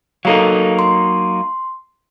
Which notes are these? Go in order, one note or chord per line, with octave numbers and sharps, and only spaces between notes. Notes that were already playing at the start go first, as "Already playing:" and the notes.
F#3 A#3 D#4 A4 F5
C6